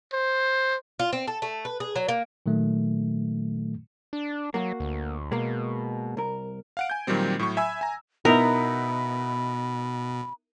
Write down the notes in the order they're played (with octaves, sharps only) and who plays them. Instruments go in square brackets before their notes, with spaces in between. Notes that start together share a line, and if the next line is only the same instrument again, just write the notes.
[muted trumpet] C5
[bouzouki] F4
C4
A4
A3
B4
G#4
F#3
A#3
[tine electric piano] A#2 D#3 F#3 A3
[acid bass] D4
[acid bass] F#3 [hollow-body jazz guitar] A#3 F#4
[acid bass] D2
[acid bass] B2 [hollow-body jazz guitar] G#3 A#3
[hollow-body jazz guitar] C2 A#4
[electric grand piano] F5 F#5 D7
G#5 G6
A#2 D#3 F#3 G3 C4
A2 F#3 C#6
E5 G#5 B5 E6
G#5 A#5
[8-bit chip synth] B2 [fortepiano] B3 D#4 E4 [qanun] A#4 [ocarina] B5